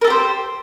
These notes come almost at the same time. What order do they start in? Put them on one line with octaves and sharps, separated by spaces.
A#4 A4 G4 C5